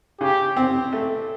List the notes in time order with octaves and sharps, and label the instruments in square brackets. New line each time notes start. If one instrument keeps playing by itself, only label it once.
[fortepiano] C#3 [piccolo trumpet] G4
[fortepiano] C4
A3